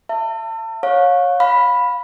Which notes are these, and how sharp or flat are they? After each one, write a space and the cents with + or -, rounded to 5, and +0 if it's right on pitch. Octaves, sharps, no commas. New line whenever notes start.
E5 +25 A5 +35
C#5 -10 F5 +35
F5 +25 B5 +0